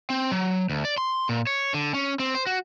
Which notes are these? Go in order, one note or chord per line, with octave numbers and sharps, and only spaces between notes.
C4
F#3
D2
D5
C6
A#2
C#5
D3
C#4
C4
C5
F#4